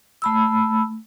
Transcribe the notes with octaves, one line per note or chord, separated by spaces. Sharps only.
A3 B5 E6